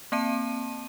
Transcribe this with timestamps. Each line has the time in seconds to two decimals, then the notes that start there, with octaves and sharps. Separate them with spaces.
0.12 A#3 C4 A5 D#7